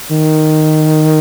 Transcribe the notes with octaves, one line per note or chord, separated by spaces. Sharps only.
D#3